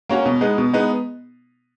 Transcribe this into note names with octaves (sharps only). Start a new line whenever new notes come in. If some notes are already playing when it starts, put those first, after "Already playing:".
A#3 C#4 F#4 A#4
B2
G#3 B3 D#4
B2
G#3 B3 D#4